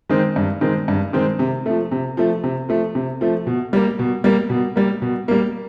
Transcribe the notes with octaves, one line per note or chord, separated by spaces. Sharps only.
D#3 G#3 C4
G2
D#3 G#3 C4
G2
D#3 G#3 C4
C3
F3 A3
C3
F3 A3
C3
F3 A3
C3
F3 A3
B2
G3 A#3
B2
G3 A#3
B2
G3 A#3
B2
G3 A#3